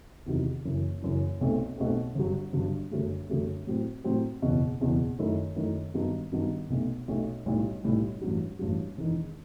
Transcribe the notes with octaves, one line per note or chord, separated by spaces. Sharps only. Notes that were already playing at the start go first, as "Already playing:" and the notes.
E2 C3 D#3 F#3
F#1 F#2 E3
F#1 F#2 E3
B1 B2 A3 C4
B1 B2 A3 C4
G1 G2 F#3
G1 G2 F#3
G1 F#2 F#3 A3
G1 F#2 F#3 A3
A2 F#3 C4
A2 F#3 C4
F#1 E2 B2
F#1 E2 B2
F#2 D#3 A3 E4
F#2 D#3 A3 E4
G2 D#3 F#3 B3
G2 D#3 F#3 B3
B1 B2 A3
B1 B2 A3
B1 A2 G3
B1 A2 G3
A1 G2 F#3
A1 G2 F#3
E1 E2 D#3